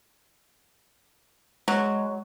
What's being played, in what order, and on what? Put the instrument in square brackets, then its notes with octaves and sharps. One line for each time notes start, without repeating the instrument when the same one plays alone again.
[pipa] F#3 [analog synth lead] G#3